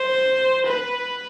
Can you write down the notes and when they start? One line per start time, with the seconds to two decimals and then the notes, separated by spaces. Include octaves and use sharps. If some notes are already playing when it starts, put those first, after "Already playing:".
Already playing: C5
0.66 B4